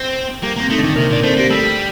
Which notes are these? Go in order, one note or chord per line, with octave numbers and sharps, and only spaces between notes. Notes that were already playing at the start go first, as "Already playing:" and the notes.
Already playing: C4
G3 A#3 G4
A#3 C4
A3 D#4
D3 D4
D#3
C3 A#3 A#4
A#2 D5
A3 C4 C5
A#3 G4
G3 A3 A4